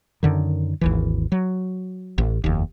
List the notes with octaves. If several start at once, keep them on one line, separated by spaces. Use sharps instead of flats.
F#2 D3 D#3
G#1 D#2 E3
F#3
A1
F1 D#2